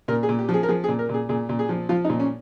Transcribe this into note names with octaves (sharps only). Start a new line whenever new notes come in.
A#2 A#4
G#4
A#2
G4
F3
G#4
A#4
F3 G#4
G#4
A#2
A#4
A#2 G#4
A#2 G#4
A#2
G#4
F3
F3 F4
D#4
A#2
C#4